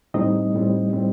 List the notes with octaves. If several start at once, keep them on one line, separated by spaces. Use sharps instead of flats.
A2 G3 C4 D#4 D#5
A2 G3 C4
A2 G3 C4